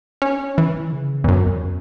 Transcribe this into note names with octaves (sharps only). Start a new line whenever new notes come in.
C#4
E3
C#3
E2
F#2
E2